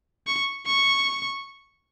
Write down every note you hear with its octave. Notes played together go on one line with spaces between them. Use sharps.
C#6
C#6